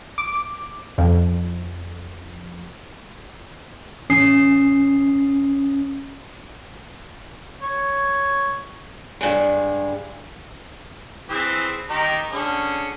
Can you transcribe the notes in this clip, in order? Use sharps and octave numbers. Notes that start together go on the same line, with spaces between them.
D6
F2
A1 C#4 D#6 C7
C#5
G2 G#3
E3 C4 G#4
D#3 D#4 G4
D3 C#4 G#4